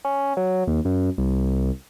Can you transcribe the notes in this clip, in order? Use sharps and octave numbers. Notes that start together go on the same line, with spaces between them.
C#4
F#3
D#2
F#2
C2